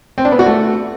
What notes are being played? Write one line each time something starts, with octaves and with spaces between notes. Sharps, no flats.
C4
D4
B3
F#4
A3